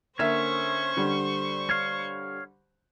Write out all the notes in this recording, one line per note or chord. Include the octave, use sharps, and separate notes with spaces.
D3 A#3 C#4 C5 E5 C#6
D3 G3
C#5 F5